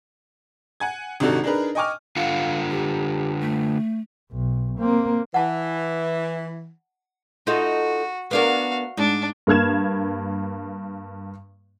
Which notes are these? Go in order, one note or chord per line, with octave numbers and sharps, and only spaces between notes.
F#5 G#5 G#6
G#1 C3 D4 D#4 F#4 A4
D4 D#4 G#4 A#4 B4
D#5 G5 G#5 C#6 D6 F6
D3 F4 F5 F#5
G4
A3
B1
A#3 C4
E3 F#5 A5
D#4 F4 F#4 A4
B3 D4 F#4 A#4 F5
G#2 D4
G2 A#3 F6 G#6 E7